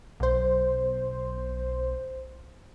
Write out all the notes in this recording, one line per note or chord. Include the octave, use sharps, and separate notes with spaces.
B1 C5